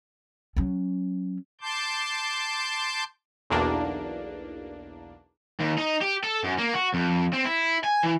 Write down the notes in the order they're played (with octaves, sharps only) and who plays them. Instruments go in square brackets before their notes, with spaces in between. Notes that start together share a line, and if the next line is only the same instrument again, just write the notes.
[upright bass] F#3 C#4
[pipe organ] A5 C6 D6 G6
[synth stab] B1 E2 A#3 D4
[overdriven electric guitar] D#2
D#4
G4
A4
F#2
A#3
F#4
F2
C4
E4
G#5
E3